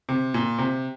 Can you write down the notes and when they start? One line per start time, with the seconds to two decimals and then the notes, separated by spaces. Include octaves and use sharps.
0.09 C3
0.34 A#2
0.58 C3